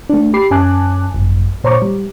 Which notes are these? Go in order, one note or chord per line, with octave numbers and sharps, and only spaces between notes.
A3 D4
G4 B5 D6 C7
F#2 C#4 G#5 A5 D6 F#6
G#1 F#2
A#2 C5 C#5 A#5 C#6 D6
G3